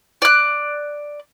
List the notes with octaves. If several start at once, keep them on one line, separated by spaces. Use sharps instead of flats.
D5 F#6